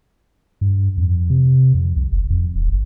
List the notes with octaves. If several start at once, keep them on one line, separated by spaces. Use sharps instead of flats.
G2
F2
C3
F2
C2
F#1
F2
D#1
G1